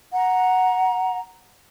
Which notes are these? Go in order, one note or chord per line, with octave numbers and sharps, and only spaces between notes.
F#5 A#5